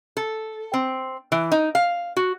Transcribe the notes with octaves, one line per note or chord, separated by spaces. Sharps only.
A4
C4
E3
D#4
F5
F#4